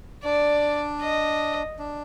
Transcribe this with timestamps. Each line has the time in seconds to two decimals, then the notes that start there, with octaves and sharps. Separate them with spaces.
0.24 D4 D5
1.02 D#5
1.79 D4